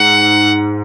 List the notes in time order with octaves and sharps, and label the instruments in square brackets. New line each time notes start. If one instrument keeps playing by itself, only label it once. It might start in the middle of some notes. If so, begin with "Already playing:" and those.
Already playing: [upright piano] G#2 [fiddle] F#5